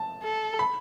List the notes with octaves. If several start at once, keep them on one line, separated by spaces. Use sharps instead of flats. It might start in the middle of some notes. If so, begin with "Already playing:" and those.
Already playing: A5
A4
B5